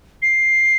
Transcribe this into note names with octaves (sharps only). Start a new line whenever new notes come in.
C7